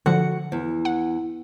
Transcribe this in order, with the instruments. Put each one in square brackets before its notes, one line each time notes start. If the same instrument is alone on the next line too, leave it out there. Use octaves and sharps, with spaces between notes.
[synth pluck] D3 F3 [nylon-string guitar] F#4 F#5
[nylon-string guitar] E2
[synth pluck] F#5